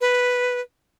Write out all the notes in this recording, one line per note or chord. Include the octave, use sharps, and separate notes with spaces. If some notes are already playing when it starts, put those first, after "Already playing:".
B4